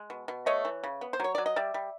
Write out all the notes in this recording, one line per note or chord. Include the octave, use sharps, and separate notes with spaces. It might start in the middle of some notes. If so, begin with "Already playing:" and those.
Already playing: G#3
B2
B2
A3 C#5 D#5
E3
C#3
B3
C5
F#3 C#5
F#3 D5
D#5
G3 D5 E5
G3